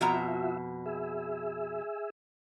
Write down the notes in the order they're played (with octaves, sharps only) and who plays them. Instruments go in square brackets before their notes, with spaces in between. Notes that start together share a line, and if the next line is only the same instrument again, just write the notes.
[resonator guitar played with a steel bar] F2 B2 A#5 [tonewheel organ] F4 F#4 E5
[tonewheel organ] G#4 E5